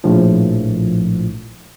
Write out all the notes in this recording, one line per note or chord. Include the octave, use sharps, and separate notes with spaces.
A#1 A2 F3